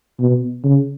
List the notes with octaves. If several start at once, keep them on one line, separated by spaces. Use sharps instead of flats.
B2
C#3